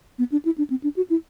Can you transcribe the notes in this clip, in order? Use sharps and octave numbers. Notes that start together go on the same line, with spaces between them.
B3
D4
E4
D4
C4
D4
F#4
E4